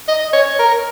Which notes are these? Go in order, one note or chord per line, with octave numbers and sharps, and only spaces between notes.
D#5
C#5
A#4